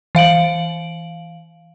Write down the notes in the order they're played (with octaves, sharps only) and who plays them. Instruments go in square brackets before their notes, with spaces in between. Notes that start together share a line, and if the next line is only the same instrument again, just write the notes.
[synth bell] E3 F5 D7 F#7